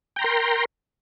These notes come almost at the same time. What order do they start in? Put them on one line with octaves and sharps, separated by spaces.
G5 A#5 C6 A#4